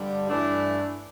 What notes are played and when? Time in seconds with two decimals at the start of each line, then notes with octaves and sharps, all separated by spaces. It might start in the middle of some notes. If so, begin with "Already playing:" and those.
Already playing: G2 D3 G3
0.29 G2 E3 A3 D4